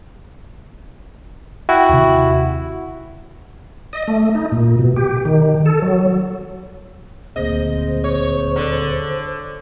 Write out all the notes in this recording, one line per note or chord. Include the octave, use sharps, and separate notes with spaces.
E4 F#4 G5
D#2 C3
D#5
A3
D#4
A#2
B2
G4
D#3
A4
F#3
D#1 D2 A#3 C4 G#4 C5 D#5
C#5
D3 D5